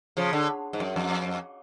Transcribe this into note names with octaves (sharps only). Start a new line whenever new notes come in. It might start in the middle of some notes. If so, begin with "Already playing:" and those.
C#3 F3
D3
G#2
F#2
F2